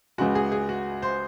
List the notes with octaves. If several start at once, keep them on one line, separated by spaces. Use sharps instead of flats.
C#2 C#3 G#3 F#4
G#4
G#4
F#4
C5